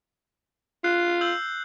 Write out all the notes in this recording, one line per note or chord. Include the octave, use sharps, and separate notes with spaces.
F4 F#6 C7
E6 G6 F#7